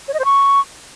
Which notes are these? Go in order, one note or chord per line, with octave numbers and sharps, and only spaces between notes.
C#5
D#5
C5
C#6